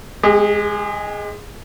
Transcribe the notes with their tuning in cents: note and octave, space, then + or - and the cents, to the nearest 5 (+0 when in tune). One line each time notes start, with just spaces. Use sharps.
G#3 +0 G4 +45